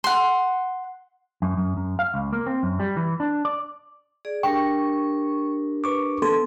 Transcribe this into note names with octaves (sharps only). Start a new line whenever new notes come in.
F#5 C6
F#2
F#2
F#2
F5
C#2
A#3
C4
F#2
G3
E3
D4
D5
G#4 D5
D4 G4 A#4 G5 C#6
B4 C#6 D6
B3 A4 C6